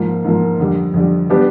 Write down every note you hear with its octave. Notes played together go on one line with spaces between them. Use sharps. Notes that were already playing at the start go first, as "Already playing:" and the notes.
Already playing: G#2 F3 A#3
G#2 F3 A#3
F2 D3 G3
F2 D3 G3
G3 B3 D4 G4